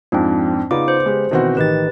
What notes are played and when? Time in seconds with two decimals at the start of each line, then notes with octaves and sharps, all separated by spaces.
0.12 F2 G#2 F3 C4 D4
0.71 C#3 B3 D#4 F4 D5 D6
0.88 C5
1.06 G#3 G4
1.31 B2 D#3 E3 C4 F#4
1.57 A1 D#3 D#4 G4 B4 A6